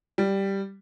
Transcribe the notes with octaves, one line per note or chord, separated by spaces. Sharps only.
G3